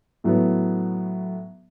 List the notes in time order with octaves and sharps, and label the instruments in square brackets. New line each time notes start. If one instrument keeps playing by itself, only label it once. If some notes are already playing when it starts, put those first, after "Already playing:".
[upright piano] A2 F#3 B3